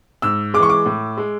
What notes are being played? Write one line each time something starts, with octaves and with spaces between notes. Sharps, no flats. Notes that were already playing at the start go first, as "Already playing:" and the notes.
G#2 E6
G#3 D6
E3 C#6
D6
A2
G#3